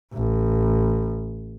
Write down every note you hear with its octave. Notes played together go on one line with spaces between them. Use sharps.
A1